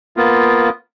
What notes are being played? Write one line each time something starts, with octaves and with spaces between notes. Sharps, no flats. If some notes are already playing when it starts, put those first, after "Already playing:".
A#3 B3 F4